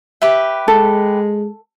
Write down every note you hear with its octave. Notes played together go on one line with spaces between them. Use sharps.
G4 B4 E5
G#3 A4